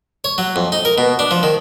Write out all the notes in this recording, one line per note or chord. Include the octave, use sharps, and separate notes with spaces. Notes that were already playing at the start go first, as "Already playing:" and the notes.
C#5
F#3
F2
D#4
A#4
B2
D4
F3
D#3